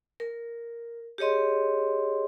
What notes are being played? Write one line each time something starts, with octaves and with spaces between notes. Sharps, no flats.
A#4
G4 G#4 C#5 D#5 C6